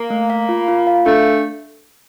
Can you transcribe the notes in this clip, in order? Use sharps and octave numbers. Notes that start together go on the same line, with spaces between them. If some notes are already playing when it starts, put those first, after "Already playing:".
Already playing: A#3
A3
F5
F4
F4
F5
A3 D4